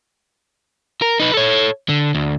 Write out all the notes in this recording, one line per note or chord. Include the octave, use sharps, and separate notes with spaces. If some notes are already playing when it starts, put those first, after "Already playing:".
A#4
D#4 B4
A4 C#5
D3
D2